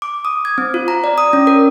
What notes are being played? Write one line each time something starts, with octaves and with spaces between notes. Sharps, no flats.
D6
D#6
G#6
C4
F4
A#5
D5
D#6
C#4
A#4